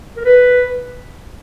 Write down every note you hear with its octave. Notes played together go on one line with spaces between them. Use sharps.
A#4
B4